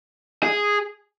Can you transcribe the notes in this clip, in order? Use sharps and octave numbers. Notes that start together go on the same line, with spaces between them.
G#4